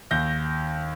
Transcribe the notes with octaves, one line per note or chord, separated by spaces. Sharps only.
D#2 G6 A#6